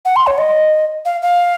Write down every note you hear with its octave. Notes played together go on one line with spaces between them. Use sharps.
F#5
C6
C#5
D#5
F5
F5